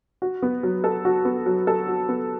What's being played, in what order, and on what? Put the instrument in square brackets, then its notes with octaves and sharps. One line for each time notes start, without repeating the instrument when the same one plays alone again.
[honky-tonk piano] F#4
B3
F#3
A4
F#4
B3
F#3
A4
F#4
B3